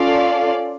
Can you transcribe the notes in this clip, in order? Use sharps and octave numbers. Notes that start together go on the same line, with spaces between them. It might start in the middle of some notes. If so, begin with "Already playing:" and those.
Already playing: C#4 F4 A4 D5 F5